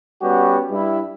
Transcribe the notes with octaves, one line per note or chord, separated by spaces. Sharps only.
G3 B3 C#4 F#4 G4
G2 E4